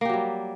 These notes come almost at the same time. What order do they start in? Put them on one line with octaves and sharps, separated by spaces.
A#3 G4 F#3 G3